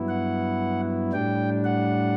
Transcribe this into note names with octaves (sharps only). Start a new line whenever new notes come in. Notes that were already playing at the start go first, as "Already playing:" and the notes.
Already playing: G2 F#3 B3 E4
F#5
A2 G3 D4 G5
F#5